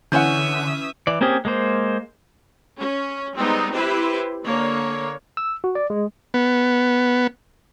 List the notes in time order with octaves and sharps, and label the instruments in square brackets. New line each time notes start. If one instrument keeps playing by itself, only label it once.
[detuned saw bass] D3 [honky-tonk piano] E3 C#4 [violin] E5 D#6 [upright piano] F#5 G#5 G6
[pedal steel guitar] E3 D5
A#3 C4 C#4 G4 G#4
G#3 A#3 C5
[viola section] C#4
G3 G#3 B3 C4 D#4
C4 E4 G4 B4 C5
D3 A#3 C#5
[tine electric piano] E6
F#4
D5
G#3
[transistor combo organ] B3